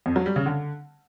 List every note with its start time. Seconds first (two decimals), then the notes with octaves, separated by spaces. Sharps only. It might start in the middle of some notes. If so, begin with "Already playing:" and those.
0.06 F2
0.16 F#3
0.26 G3
0.36 C#3
0.46 D3